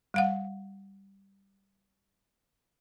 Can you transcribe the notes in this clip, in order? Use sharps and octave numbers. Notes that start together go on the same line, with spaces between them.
G3 F5 F#5